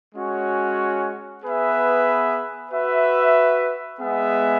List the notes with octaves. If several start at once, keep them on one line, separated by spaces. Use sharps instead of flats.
G#3 C#4 F#4 C#5
B3 G#4 B4 E5
F#4 B4 E5
G#3 B3 G#4 E5